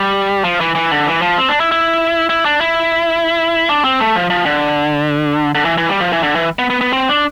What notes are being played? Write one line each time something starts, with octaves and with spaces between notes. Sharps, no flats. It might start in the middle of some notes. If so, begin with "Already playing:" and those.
Already playing: G3
F3
E3
E3
D3
E3
F3
C4
D4
E4
E4
E4
D4
E4
D4
C4
A3
F3
F3
D3
D3
E3
E3
G3
F3
E3
D3
E3
B3
B3
B3
C4
D4